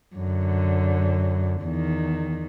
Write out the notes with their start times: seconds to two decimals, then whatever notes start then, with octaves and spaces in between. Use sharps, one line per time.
0.16 F#2 D3
1.61 E2 D#3